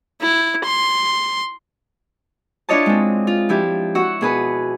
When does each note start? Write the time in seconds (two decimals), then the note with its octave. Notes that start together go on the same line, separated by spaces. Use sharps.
0.21 E4
0.65 C6
2.69 D4 E4 F4 C#5 D#5 A5
2.86 G#3 C4
3.27 F4
3.49 F3 E4 G4
3.95 F#4 F#5 C#6 E6
4.21 B2 G#4 B4